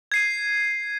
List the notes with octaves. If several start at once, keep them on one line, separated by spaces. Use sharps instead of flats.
G#6 C7 D#7